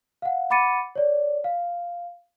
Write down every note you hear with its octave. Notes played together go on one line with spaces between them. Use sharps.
F5 F#5
F#5 B5 D6 A6 C#7 D#7
C#5 D5
F5